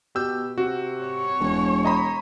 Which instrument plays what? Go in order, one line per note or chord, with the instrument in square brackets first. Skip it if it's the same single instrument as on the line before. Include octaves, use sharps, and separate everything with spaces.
[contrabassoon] B2 [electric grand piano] G4 E6 G6
[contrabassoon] C3 [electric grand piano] F#4
[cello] C#5
[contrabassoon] E1
[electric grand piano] D#5 A#5 B5